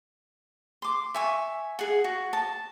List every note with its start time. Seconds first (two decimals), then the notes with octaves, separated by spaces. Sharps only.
0.82 C6 D6
1.14 E5 G#5 C#6
1.79 G#4 F#5
2.04 F#4
2.33 A5